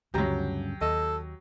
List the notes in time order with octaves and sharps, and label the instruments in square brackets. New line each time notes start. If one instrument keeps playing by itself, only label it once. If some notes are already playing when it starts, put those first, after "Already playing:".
[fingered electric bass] D2 [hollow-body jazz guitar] G2 C#3 A#5 [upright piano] F#3 G4
[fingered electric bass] D#2 [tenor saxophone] A4 [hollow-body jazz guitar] D#5